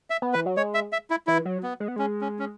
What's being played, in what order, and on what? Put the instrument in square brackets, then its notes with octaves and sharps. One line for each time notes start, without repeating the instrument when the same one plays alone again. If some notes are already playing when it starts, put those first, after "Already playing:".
[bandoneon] E5
[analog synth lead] B3
[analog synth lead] E3 [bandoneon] B4
[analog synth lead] F#3
[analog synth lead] G#3 [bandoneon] C#5
[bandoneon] E5
E5
E4
[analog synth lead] E3 [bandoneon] E4
[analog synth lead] F#3
[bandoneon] B3
[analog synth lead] G#3
B3
[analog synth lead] G#3 [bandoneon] C#4
[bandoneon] C#4
C#4